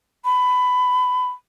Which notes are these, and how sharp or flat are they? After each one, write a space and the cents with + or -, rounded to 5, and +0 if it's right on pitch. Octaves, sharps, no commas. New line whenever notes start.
B5 +20